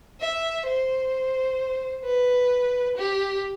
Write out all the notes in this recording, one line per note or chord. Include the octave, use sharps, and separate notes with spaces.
E5
C5
B4
G4